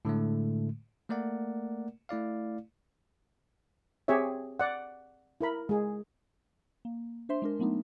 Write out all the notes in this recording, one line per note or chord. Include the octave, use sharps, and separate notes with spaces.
A2 D3 G#3 A3
A3 A#3 A#4 D5 F#5
A3 E4 D5 F5
C4 G4 G#4 C#5 E5
D5 F#5
E4 A#4 B5
G#3 G#4
A#3
D4 C5 E5 C6
G#3 D4 A#4
F#3 A3 B3 D4 D#4